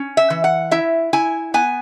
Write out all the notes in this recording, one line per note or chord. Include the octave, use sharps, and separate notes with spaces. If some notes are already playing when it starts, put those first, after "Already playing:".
Already playing: C#4
E5
E3
F#5
E4 E5
E4 G#5
B3 G#5